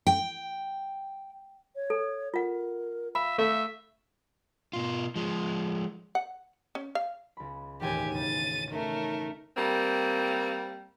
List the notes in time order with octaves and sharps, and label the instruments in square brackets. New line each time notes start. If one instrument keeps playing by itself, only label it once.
[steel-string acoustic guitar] G5
[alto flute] C#5
[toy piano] A4
[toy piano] F4 F#5 [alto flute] A#4
[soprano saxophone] E5 [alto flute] F5 [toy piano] B5
[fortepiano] A3 [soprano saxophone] E5
[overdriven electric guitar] B2 F4
F3 G#3
[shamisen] F#5
C#4
F5
[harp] C#2 B5
[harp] E1 A1 D#2 [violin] G4 G#5
[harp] C#3 [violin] A6 D#7
[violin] A3 A#4 [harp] C#4 D#4
[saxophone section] G3 A#3 C4